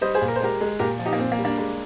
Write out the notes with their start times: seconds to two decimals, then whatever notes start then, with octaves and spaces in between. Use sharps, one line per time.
0.01 G3 C5 D#5
0.14 G#4 C5
0.21 A#2
0.28 A#4
0.35 C5
0.40 G#3 G4 A#4
0.61 G#3
0.79 A#2 G4 A#4
0.99 F3
1.05 D#4 G4
1.13 A#3
1.18 A#2 C4
1.32 A#3
1.39 G3
1.45 A#3 D4
1.58 G#3